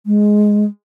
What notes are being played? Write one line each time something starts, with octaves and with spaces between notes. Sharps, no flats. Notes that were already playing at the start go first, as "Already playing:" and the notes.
G#3